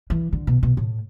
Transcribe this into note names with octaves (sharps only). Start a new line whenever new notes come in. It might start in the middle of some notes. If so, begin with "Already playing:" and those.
E3
D3
B2
B2
A2